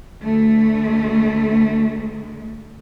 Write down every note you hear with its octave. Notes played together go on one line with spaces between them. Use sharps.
D2 A3